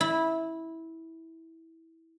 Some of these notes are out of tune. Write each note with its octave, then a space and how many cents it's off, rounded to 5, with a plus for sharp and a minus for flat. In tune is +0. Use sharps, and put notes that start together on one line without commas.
E4 -15